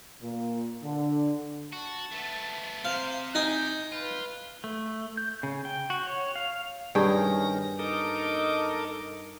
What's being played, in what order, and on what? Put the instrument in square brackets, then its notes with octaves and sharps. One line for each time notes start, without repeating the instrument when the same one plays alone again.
[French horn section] A#2
D3
[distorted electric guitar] F#4 [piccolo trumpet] A5
[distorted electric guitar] A3 B3
[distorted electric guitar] C3 [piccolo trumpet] C5 [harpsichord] F5
[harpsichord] D#4 G#5 [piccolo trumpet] G6
[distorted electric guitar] F4 [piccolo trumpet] B4
[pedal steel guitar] A3
G6
C#3
G5
F#4
C#5
F5
[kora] G2 G#4 G5 [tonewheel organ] D#3 C#4 A#6
[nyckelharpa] D#4 D6 [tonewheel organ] A4 A#4 D#5